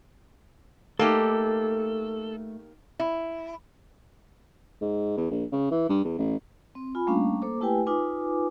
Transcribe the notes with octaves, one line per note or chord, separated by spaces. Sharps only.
A3 A#3 D#4 G4 A4
E4
G#2
E2
A#1
C#3
E3
G2
E2
A1
C4
F4 G#5 B5
G3 A3 A#3 C#4 D4 F5
A#3 A4 C5 D6
A3 E4 G4 B4 G5 G#5
D#4 F4 B4 G#5 D6